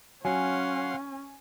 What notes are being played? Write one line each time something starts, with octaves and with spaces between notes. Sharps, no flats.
F#3 C#4 F5 F#5 G#5 C6